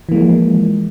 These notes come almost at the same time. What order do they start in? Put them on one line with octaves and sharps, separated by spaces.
E3 A#3 G#3 F3